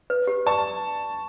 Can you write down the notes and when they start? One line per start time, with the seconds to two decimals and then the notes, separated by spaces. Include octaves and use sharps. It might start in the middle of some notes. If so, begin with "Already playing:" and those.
0.10 B4
0.27 G4
0.46 D5 A5 C#6